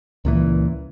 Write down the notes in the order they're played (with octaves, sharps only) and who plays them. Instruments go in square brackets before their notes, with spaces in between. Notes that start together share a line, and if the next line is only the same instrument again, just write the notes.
[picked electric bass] C#2 A#2 E3